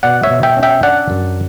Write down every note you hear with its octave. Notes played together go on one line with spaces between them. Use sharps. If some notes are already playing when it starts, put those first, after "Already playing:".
B2 D5 F#5
C#5 E5
B2
E5 G5
C#4
E5 G5
D4 D5 F#5
F#2